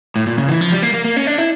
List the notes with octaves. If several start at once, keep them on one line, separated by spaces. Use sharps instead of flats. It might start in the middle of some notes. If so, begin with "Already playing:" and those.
A2
A#2
C#3
E3
F3
G3
A#3
A#3
A#3
C#4
D4
E4